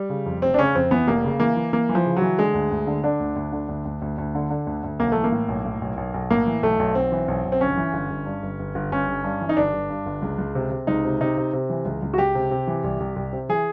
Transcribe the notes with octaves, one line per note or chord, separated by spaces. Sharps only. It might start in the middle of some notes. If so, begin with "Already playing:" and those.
Already playing: G3
C#3
F2
F1 C4
D4
C#3 C#4
F2 C4
E3 B3
F1 A#3
C#3
E3 A#3
E3
E3 A#3
E3
F3
C#3
F#3
E3
D3 G#3
D2
D2
D3
D3 D4
D2
D2
D3
D2
D2
D2
D2
D3
D3
D2
D2
B1 A#3
E3 A3
A#3
A2
B1
A2
B1
B1
B1
A2 A#3
E3
B1 A3
B1
B1 C4
E3
B1
B1
C4
G1 C#4
E3
G1
G1
G2
G1
G1
G1
G1 C#4
G1
G2
E3
D#4
G1 D4
G1
G2
G1
C#2
C#2
C3
C3
C#2 D#4
C3
C3 D#4
C3
C3
E3
C#2
C#2
F#4
C#2 G4
C3
C3
E3
C2
C2
C2
C3
E3 G#4